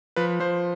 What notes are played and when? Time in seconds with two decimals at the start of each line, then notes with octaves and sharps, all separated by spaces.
0.16 F3 B4
0.40 F3 C5